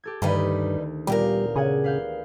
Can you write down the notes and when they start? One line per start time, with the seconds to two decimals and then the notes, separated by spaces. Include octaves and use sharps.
0.04 G4 A4 G#6
0.22 D2 G2 D#3 G3 D#4 B4
1.07 E2 A#2 G3 F4 G4 A#4
1.56 C#3 G#4 F#5 G#5
1.84 B4 F5 G6